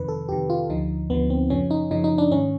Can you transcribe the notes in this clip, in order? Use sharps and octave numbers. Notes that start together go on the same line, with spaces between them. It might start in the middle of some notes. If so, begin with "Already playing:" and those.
Already playing: F2 C3 D#3 B4
A4
F2 C3 D#3 G4
F4
D2 D3 F3 D#4
D2 D3 F3 B3
C4
F#2 C#3 F3 C#4
D#4
F#2 C#3 F3 D#4
D#4
D4
G#2 D#3 C#4